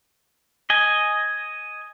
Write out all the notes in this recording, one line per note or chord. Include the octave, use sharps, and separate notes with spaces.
D#5 G#5